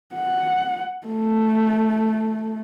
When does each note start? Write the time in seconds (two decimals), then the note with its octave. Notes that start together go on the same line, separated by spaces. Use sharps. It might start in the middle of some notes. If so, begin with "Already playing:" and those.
0.15 F#5
1.07 A3